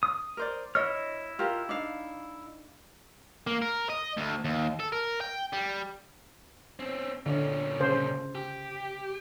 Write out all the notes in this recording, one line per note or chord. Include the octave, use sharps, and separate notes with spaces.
D#6
A#4 C5 D5
E4 C#5 D#5 F6
F4 G4 A#4
D4 D#4 F5
A#3
A#4
D#5
D2
D#2
A4
A#4
G5
G3
C4 C#4
A#2 D3 C#4
C#3 C5
G4